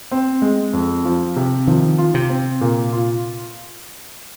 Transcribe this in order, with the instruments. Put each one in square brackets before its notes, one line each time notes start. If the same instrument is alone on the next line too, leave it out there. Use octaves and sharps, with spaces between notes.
[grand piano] C4
G#3
F2
F3
C3
[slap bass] D#3 [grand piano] F3
[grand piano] F4
[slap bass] C3
[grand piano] C4
A#2
F4